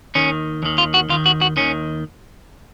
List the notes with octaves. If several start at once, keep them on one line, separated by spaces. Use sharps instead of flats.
D#2 D#3 C#4
D#2 D#3
F4
F#4
D#2 D#3 F4
F#4
F#4
D#2 D#3 C#4